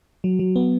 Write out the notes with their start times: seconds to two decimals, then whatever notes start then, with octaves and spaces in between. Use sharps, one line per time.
0.24 F#3
0.39 F#3
0.56 B3